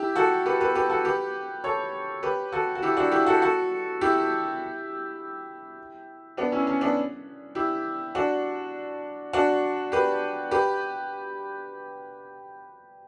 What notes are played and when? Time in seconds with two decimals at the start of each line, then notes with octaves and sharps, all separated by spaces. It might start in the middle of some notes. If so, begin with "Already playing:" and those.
Already playing: E4 G4
0.16 F#4 A4
0.46 G4 B4
0.60 G4 B4
0.75 G4 B4
0.90 F#4 A4
1.05 G4 B4
1.64 A4 C#5
2.23 G4 B4
2.52 F#4 A4
2.75 F#4
2.82 E4 G4
2.97 D4 F#4
3.11 E4 G4
3.26 F#4 A4
3.42 F#4 A4
4.01 E4 G4
6.37 B3 D4
6.52 C#4 E4
6.67 C#4
6.81 B3 D4
7.55 E4 G4
8.15 D4 F#4
9.33 D4 F#4
9.92 G4 B4
10.51 G4 B4